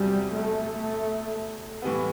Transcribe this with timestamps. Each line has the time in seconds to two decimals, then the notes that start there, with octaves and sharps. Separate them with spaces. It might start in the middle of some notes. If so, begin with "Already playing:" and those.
Already playing: E2 C3 F#3 G3 C4 G4
0.33 A3
1.82 A2 E3 G3 B3